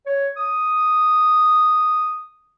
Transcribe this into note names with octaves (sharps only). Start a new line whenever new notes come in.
C#5
D#6